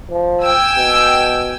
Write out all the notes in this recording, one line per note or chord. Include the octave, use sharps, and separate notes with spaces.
F3
G5 G#5 E6
B2